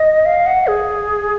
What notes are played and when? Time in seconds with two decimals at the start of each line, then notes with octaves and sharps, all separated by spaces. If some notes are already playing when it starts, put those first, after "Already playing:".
Already playing: D#5
0.26 F5
0.46 F#5
0.67 G#4